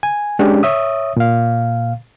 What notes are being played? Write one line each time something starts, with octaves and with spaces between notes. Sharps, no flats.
G#5
G#3 C#4 D4 G4
C#5 E5 D#6
A#2 F5